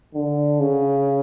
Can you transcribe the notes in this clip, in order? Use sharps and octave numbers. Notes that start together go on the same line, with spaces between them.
D3
C#3